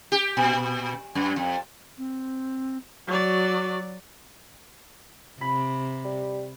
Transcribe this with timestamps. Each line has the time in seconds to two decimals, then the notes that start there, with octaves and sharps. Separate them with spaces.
0.12 G4
0.37 A#2
1.15 F#2
1.36 F2
1.98 C4
3.07 F#3 F#4 D5
5.41 C3 B5
6.05 G3